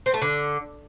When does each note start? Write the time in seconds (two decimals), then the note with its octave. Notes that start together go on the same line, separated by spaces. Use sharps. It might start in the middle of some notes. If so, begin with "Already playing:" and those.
0.06 C4
0.14 A3
0.22 D3